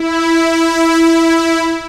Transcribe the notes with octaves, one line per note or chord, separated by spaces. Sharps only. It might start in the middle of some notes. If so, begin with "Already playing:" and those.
Already playing: E4